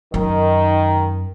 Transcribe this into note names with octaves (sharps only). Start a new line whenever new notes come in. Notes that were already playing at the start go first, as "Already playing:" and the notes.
F#2 D#3